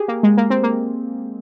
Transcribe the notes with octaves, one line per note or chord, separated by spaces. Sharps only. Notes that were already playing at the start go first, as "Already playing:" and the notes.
Already playing: G4 G#4
A#3
G#3
A#3
C4
A#3